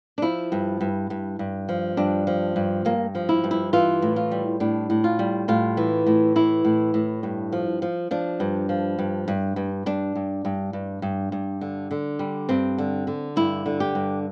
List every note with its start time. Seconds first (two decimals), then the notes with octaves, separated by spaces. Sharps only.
0.18 D4
0.22 F3 E4
0.52 G2
0.81 G2
1.10 G2
1.39 G2
1.69 F3
1.97 G2 D4
2.27 F3
2.56 G2
2.85 G2 A#3
3.15 F3
3.29 E4
3.44 G2
3.51 E4
3.73 E3 F4
4.02 A2
4.16 F4
4.31 G3
4.60 A2 D4
4.90 A2
5.04 F4
5.19 G3
5.48 A2 F4
5.77 E3
6.06 A2
6.36 E3 E4
6.65 A2
6.94 A2
7.23 G2
7.52 F3
7.82 F3
8.11 F3 D4
8.40 G2
8.69 F3
8.99 G2
9.28 G2
9.56 G2
9.86 G2 D4
10.15 G2
10.45 G2
10.73 G2
11.02 G2
11.32 G2
11.61 D3
11.91 D3
12.19 G3
12.49 G2 C4
12.78 D3
13.07 D3
13.36 G2 E4
13.66 D3
13.80 G4
13.95 G2